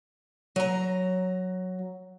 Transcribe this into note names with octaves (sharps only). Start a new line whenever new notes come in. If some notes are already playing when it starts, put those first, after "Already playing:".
F#3 A#5